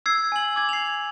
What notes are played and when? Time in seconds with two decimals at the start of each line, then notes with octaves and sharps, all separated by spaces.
0.06 E6 G#6 C7
0.32 G#5 F#7
0.56 D6 G#6
0.69 C7 F7